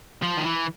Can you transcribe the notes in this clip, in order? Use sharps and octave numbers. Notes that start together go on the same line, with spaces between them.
F3
D#3
E3